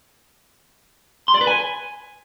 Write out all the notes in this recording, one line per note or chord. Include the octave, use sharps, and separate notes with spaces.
C6
D5
B4
G#5